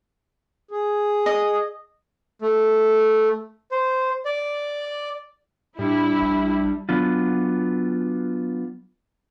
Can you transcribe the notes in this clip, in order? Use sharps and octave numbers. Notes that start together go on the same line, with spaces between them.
G#4
D#5
A3
C5
D5
A2 G3 D4 E4
A#1
F#3 B3 D4 F4